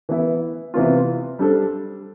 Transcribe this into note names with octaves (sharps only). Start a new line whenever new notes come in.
E3 B3 E4
C3 E3 B3 F4
G3 D4 A4 C5